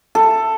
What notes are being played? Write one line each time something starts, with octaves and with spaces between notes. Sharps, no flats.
A4